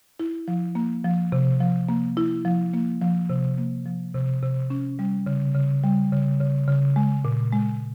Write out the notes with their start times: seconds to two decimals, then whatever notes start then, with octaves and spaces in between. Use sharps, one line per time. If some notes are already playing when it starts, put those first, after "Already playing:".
0.20 E4
0.48 F3
0.75 A#3
1.05 F3
1.32 C3
1.60 F3
1.89 A#3
2.17 E4
2.45 F3
2.74 A#3
3.02 F3
3.30 C3
3.58 A#3
3.85 F3
4.14 C3
4.42 C3
4.70 C#4
4.99 G3
5.26 C#3
5.55 C#3
5.84 G3
6.12 C#3
6.40 C#3
6.67 C#3
6.96 G#3
7.25 A#2
7.52 G#3